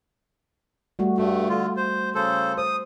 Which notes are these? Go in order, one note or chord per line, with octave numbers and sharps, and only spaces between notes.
G3 A3 F#4
G2 A3 F#4
D3 F4
C5
C#3 A4 C5
C5 D#6